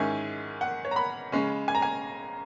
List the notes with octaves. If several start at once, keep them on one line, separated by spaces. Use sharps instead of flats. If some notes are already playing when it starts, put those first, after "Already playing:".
Already playing: G#2 D#3 G#3 C#4 E4 G#5
F#5
C#5
A#5
B5
C#3 G#3 C#4
G#5
A#5
G#5